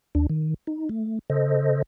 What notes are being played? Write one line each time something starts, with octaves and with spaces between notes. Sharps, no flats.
D#2 D4
D#3
D#4
A3
C#3 A4 C5 D#5